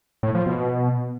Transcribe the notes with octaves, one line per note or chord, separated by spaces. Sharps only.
A2
F3
B2